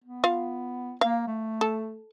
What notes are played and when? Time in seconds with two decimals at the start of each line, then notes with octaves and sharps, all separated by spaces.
0.04 B3
0.24 F4 F5
1.01 A#3 F5
1.28 A3
1.61 A4